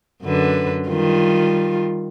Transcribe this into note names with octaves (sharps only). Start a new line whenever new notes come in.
F#2 D3 B4
D#3 G3 F4